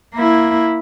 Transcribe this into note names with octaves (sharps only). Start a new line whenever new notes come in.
A#3 E4